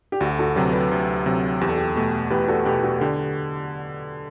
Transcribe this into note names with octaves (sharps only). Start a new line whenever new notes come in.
G4
D2 F#4 A4
F#4 A4
C3 F#3 G4 B4
G4 B4
D2 G4
C3 F#3
E2 G4
A4
G4
B2 A3
E2 G4 B4
F#4 A4
B2 A3 G4 B4
F#4 A4
D3 G4